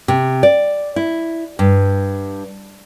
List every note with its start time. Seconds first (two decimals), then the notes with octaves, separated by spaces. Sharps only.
0.08 C3
0.43 D5
0.96 E4
1.59 G2